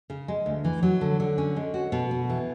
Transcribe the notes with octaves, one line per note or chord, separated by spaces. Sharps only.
C#3
G#3
D2
E3
F#3
D3
D3
C#4
G#3
F#4
B2
B3
E3